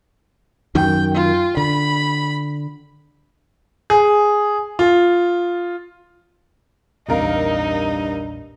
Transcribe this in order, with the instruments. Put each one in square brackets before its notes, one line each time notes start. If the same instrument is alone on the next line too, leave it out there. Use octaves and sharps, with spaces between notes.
[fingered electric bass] F#2 D#3 [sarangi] G5
[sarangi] F4
[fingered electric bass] D3 [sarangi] B5
[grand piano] G#4
F4
[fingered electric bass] A#1 E2 [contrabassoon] G2 [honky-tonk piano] C3 A#4 F5 [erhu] D#4